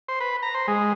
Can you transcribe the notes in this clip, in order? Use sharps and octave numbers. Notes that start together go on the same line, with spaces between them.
C5
B4
A#5
C5
G#3